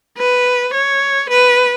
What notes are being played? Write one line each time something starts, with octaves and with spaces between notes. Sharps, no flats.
B4
C#5
B4